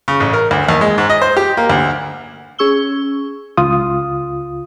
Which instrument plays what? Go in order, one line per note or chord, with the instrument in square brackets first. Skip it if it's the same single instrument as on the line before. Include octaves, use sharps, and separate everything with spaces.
[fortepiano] C#3
A1
A#4
D2
D#2
G#3
G#2
D#5
C5
G4
A#3
D2
[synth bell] C#4 G#4 C#6 E6 G7
[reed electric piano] C#2 F4 D#6